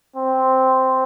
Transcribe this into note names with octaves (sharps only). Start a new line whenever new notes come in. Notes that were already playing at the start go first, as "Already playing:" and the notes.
C4